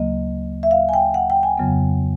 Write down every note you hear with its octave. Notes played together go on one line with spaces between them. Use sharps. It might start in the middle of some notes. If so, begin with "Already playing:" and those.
Already playing: D2 C#3 F#3 A#3 D#5
E5
F5
G#5
G5
F#5
G5
G#5
F2 C#3 F#3 B3